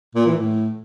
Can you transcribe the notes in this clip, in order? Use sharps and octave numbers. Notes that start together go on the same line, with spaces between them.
A#2
E3
A2